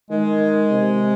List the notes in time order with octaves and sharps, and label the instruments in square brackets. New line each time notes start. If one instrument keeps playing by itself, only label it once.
[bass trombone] D#3 [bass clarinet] G#3
[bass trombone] C3